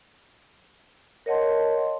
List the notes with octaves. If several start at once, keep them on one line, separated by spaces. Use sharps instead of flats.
A#4 C#5 D#5 F#5 A5 C6